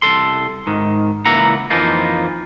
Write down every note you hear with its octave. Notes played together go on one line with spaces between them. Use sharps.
C2 A4 C6
G#2 D#3
C#2 E3 A#3 E4 F#5 A#5
F2 E3 F3 A#3 D#4 F4